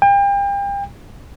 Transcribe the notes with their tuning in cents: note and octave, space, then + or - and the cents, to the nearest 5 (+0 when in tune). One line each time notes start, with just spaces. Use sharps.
G5 +35